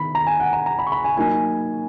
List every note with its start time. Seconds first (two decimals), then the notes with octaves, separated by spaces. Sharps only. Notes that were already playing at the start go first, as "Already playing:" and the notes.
Already playing: D#3 B3 B5
0.15 A#5
0.27 G#5
0.40 F#5
0.53 A#5
0.66 A#5
0.79 B5
0.87 C#6
0.92 B5
1.04 G#5
1.17 F#3 A#3 D#4 G#5